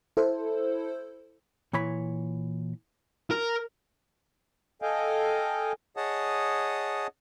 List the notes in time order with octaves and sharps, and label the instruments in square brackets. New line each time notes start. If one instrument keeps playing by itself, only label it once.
[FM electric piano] E4 A4 C5
[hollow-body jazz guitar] A#2 E3 C#5 B5
[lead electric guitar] A#4
[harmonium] A4 D#5 F5 G5 G#5
[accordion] G#4 C#5 D#5 F#5 A5 D#6